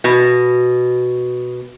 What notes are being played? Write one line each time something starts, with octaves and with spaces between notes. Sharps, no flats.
B2